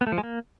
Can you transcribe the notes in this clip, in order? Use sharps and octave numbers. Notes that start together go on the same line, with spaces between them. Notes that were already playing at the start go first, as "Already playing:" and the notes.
B3
A3
F3
G#3
A#3